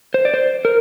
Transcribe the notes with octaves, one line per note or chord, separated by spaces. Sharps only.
C5
D5
C5
A#4